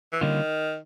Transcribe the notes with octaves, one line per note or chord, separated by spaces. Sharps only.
E3
D3 D#3 G3 A#3 C#4 F4